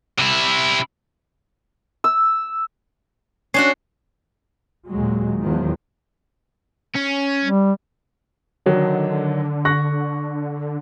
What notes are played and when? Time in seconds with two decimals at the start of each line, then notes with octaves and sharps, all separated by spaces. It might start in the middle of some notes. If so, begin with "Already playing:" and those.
0.18 C3 E4
2.04 E6
3.54 C#4 D4 F#4 C7
4.89 D#2 A#2 F#3 G#3
5.41 E2 D#3 F3 F#3
6.95 C#4
7.45 G3
8.66 D3 D#3 F#3 D#4
9.65 C#6 F#6 A#6